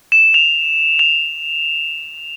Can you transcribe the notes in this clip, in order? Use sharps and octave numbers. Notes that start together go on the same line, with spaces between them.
E7
F7
F7